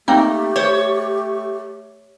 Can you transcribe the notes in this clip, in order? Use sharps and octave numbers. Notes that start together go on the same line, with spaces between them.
A3 A#3 C4 D#4 G4
C5 C#5